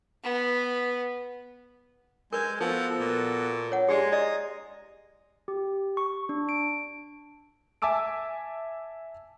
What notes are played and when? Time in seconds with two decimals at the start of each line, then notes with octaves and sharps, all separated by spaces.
0.23 B3
2.33 G#3 A#4 B4 G#5 G6
2.60 F3 B3 F#4 A4 A#4
2.99 A#2
3.72 C#5 F#5
3.89 G#3 G4 G#4 D5 A#5 C6
4.12 E4 D5 D#5 A#5 D#6
5.48 G4
5.97 C#6
6.29 D4
6.49 D7
7.82 E5 G#5 A5 D6 E6 D7